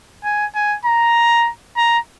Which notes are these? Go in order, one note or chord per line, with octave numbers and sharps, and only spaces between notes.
G#5
G#5
A#5
A#5